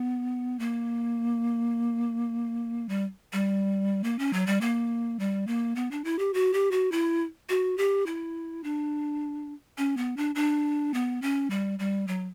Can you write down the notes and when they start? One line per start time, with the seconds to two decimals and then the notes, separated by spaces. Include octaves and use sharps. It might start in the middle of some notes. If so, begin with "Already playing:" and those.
Already playing: B3
0.59 A#3
2.89 G3
3.33 G3
4.04 A#3
4.19 C#4
4.33 F#3
4.47 G3
4.61 A#3
5.19 G3
5.47 A#3
5.76 B3
5.91 D4
6.04 E4
6.19 G4
6.34 F#4
6.53 G4
6.71 F#4
6.92 E4
7.49 F#4
7.78 G4
8.06 E4
8.64 D4
9.78 C#4
9.97 B3
10.17 D4
10.35 D4
10.94 B3
11.22 C#4
11.50 G3
11.79 G3
12.08 F#3